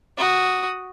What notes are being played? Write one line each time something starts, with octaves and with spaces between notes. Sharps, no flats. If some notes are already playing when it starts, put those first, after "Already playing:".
F#4 D#6